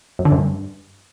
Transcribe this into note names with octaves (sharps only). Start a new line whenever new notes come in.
F#2
D3
F#2
G2